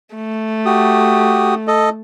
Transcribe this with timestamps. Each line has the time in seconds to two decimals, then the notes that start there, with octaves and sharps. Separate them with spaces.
0.15 A3
0.66 F#4 G4 D#6
1.68 A4 D#5